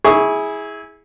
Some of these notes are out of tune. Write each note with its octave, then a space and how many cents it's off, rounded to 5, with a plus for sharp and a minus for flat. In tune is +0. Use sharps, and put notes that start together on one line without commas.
E4 -20 G#4 +0 C#6 +0